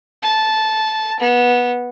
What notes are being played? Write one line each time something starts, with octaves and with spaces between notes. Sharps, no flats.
A5
B3